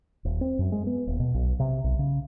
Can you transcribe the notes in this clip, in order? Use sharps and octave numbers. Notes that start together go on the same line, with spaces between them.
D#1
C4
F#2
G#3
B3
D#1
B2
B1
C3
B1
C#3